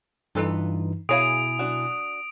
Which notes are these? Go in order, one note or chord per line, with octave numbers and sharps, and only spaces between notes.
G2 E3 D#4 F4 A4 B4
B2 E4 G#4 C#5 F5 G#5 D#6 D7
F#3 D4 F#4